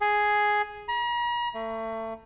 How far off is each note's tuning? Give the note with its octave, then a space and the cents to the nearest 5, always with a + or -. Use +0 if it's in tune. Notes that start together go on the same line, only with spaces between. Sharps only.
G#4 +5
A#5 +45
A3 +30